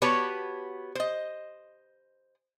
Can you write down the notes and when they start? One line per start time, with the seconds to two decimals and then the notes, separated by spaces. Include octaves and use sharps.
0.02 B3 F#4 G4 B4 C#5 A5
0.95 C5 D#5